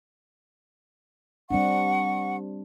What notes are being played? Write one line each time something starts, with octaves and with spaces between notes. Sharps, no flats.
G3 C4 D4 F#5 C#6